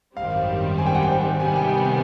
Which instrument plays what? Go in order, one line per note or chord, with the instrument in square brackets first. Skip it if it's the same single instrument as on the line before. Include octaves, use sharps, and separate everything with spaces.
[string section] G#1 F#2 D#3 G3 C4 [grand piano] F5
[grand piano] G#5
G5
F#5
G5
[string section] C3 D#3 G3 B3 [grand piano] G#5
[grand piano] G5
G#5